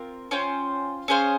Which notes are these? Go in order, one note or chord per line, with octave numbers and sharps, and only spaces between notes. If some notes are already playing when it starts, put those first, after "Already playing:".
Already playing: C4 F4 A#4
C#4 F4 C5 G5
C#4 G#4 C5 F5